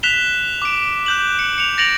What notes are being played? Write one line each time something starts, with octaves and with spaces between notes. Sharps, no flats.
F#6 B6 E7 F7 G7
D6 D7
F#6 G6 F#7
C#7
C#7 F7
A6 A#6 C#7 D7 F7 F#7